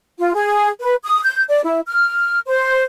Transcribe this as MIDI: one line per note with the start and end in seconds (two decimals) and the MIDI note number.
0.18 0.33 65
0.34 0.69 68
0.80 0.94 71
1.03 1.22 87
1.23 1.43 91
1.49 1.59 74
1.64 1.80 64
1.86 2.40 89
2.47 2.82 72